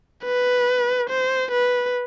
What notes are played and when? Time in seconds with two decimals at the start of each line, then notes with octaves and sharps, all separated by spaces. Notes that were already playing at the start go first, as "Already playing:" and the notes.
0.25 B4
1.10 C5
1.52 B4